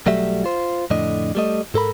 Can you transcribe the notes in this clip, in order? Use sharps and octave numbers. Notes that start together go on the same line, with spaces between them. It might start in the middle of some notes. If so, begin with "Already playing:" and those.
B1 F#3 G3 A3 E5
F4 C5
F2 A2 D3 D4 D#5
G3 A3 D#5
G#2 A4 A#4 B5